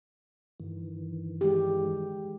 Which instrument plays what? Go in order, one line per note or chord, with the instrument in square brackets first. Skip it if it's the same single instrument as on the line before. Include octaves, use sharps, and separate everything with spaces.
[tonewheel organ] G2 D#3 E3
[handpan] G#3 G4